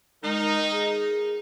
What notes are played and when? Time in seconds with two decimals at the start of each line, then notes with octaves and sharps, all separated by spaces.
0.24 D#3 G#3 D#4
0.72 G#4